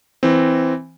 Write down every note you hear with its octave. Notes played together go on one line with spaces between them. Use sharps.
E3 C4